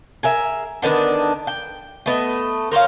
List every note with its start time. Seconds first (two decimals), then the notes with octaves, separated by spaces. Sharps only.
0.23 G#4 A#4 E5
0.82 D3 D#3 B3 D4
1.47 G5
2.06 A3 B3 D#5
2.71 A#4 C5 C#5 F5